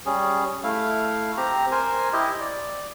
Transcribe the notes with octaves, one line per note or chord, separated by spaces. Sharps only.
G3 C#4 G#4
A3 E4 F5
C4 G4 A#5
A#4 C5 G#5
E4 G4 D#5
D5